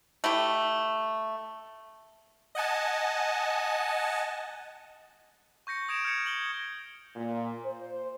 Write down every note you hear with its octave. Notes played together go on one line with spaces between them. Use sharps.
A3 E4 G4
D#5 F#5 G#5 A5
C#6 G6 A#6 C#7
D#6 G#6 D7 E7 F7
F6 G6 G#6 C#7
G6 F#7 G7
A#2
C5